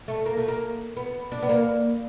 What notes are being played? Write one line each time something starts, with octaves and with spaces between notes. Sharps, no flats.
A3
A#3
A3
A#3
B3
D4
B3
A#3